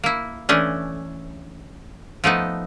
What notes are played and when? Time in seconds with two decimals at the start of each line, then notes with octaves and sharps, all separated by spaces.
0.04 A#3 E4
0.49 E3 A3 C#4 D4
2.24 F3 A3 B3 D#4